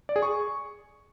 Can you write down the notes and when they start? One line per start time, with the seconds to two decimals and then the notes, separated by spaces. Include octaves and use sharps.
0.09 D5
0.16 G#4
0.22 C#6